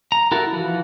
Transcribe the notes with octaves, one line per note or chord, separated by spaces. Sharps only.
A#5
E4 F#4 A4 A#4
E3 F3 F#4